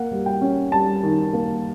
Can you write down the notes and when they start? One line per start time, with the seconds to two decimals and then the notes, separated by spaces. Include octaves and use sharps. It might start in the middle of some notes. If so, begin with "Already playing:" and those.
Already playing: A#3 F#5
0.11 G3
0.26 G5
0.41 C#4
0.72 G3 A5
1.03 D#3
1.33 A#3